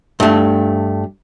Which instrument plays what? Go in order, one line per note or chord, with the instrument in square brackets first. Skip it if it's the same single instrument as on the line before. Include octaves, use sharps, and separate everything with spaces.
[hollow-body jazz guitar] G2 A3